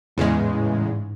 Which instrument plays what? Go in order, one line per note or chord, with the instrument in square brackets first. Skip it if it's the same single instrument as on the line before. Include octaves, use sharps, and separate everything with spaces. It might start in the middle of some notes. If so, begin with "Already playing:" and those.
[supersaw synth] E2 C#3 G#3 [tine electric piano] A2
[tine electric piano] G#2
A2
A2
G#2